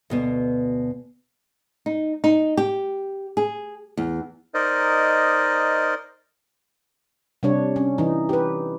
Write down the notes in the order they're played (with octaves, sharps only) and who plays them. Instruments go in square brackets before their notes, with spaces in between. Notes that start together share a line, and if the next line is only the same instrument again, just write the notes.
[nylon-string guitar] D2 B2 B3
D#4
D#4
G4
G#4
E2
[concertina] D#4 A#4 C5 D5 D#5
[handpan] C3 G3 D4 C#5
C#4
E3 D#4
G4 B4